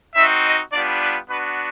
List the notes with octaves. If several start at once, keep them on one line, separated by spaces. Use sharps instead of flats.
C4 D#4 F#4 E5
D#5
G3 B3 D4 F4 D5
B4
B3 D4 F#4 B4